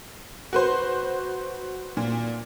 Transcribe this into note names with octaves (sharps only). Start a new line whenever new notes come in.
F#4 B4 C5
A#2